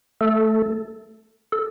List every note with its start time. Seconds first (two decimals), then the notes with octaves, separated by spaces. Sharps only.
0.21 A3 A4
1.52 A4